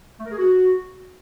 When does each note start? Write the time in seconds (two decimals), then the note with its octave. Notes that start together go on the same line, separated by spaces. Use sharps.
0.19 A3
0.25 A#4
0.31 G#4
0.37 F#4